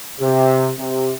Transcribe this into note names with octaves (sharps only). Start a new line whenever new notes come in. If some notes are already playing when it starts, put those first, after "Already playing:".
C3
C3